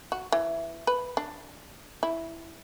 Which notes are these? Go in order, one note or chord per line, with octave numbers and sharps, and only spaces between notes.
F#4
E3
B4
D4
E4